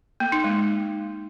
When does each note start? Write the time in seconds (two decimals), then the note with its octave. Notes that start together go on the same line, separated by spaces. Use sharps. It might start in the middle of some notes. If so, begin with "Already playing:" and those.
0.20 A#3
0.32 D#4
0.44 G#3